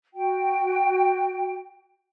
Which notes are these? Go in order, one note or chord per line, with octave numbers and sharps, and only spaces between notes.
F#4 G5